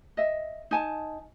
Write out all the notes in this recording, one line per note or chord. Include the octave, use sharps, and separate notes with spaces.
D#5 E5
D#4 G#5 A5